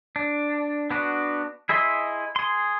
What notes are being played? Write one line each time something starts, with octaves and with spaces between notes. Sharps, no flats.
D4
B3 D4 F#4
E4 G#4 D#5 E5 C6
G#4 C6